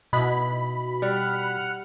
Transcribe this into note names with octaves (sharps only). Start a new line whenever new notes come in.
B2 D#4 E4 B5
G3 F#5 F6